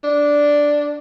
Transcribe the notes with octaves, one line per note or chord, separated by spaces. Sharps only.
D4